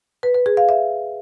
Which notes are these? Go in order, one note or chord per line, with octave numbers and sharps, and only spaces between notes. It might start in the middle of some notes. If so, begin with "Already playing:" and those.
B4
B4
G#4
F5
E5